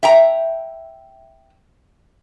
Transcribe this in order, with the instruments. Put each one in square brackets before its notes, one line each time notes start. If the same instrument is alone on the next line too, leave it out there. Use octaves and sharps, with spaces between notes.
[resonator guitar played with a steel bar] E5 G5 A#5